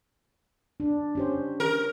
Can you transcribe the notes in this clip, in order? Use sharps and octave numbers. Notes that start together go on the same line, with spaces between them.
D4
C#4 G4 C5
A#4